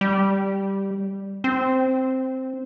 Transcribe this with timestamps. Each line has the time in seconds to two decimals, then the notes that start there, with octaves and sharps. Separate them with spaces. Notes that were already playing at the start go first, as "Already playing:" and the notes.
0.01 G3
1.44 C4